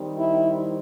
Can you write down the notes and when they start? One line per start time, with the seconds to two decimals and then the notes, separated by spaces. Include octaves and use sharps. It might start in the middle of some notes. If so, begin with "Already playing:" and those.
Already playing: D#3 G3 C4
0.18 E4